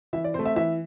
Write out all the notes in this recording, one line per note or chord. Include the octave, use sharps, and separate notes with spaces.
E3 E5
D5
A3 C4 C5
E5
E3 E5